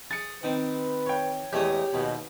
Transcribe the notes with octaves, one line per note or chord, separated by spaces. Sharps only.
G#4 A6 C#7
D#3 C4 B4
C#5 G5
E2 G#3 A3 G4 C#5 D#6
D#2 G#2 B2